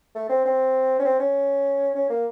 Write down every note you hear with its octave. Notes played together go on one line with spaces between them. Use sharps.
A3
C4
C4
C#4
C4
C#4
C#4
A#3